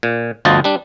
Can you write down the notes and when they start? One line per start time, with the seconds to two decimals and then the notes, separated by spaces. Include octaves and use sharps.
0.03 A#2
0.45 G1 D2 F3 D#5 A5
0.64 G3 D4